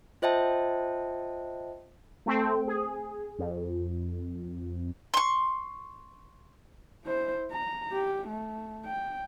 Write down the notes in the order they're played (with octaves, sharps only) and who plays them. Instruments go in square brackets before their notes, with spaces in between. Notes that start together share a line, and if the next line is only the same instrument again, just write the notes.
[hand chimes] F4 C5 D#5 E5 G5 A5
[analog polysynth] A3 C4 G5
G#4
F2
[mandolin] C6 C#6
[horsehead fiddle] E4 C5
A#5
G4
A3
G5